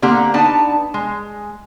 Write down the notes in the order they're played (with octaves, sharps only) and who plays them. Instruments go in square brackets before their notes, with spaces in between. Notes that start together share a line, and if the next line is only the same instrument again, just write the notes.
[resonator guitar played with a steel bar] D3 A#3 C4 G4 F#5 A#5
B3 D4 D#4 A5
G#3